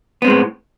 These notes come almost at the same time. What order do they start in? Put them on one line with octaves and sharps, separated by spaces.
B3 C4 G#3 A2